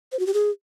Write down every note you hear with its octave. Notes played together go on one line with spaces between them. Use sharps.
C5
F#4
G4
G#4